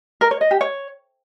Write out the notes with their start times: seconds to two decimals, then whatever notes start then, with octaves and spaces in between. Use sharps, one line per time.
0.21 A#4
0.31 C#5
0.41 D#5
0.51 G4
0.61 C#5